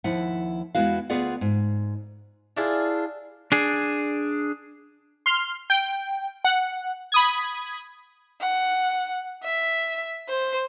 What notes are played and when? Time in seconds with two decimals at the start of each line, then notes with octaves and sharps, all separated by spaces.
0.04 D#2 F3 E4 F#5
0.75 E2 G#3 B3 E4 F#4 F5
1.10 D2 B3 F4 G#4 D5 F#5
1.41 G#2
2.56 D4 E4 F4 G#4
3.52 D4 G#4
5.26 C6 F6
5.70 G5
6.44 F#5
7.12 B5 D#6 G#6
8.41 F#5
9.43 E5
10.28 C5